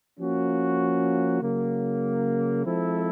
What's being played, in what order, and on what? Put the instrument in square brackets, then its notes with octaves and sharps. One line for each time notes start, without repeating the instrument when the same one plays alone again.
[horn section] F3 A#3 C#4 F#4
C#3 F#3 A#3
F3 G#3 C4 E4 A4